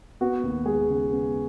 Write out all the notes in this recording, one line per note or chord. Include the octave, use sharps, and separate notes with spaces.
B3 F#4
D#2
G#3 G#4
C#3
B3